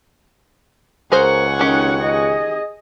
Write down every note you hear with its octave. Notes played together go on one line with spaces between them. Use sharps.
C#2 G#4 A#4 C5 F#5 G#5 C#6
D#3 C#4 D#4 G4
G#4 D#5